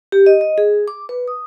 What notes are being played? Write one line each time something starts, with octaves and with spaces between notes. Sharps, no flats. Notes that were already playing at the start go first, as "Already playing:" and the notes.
G4
D#5
D#5
G#4
D6
B4
D#6